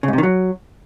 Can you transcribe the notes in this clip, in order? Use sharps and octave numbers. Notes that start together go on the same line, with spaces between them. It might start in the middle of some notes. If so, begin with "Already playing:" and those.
C#3
G#2
C3
D#3
F#3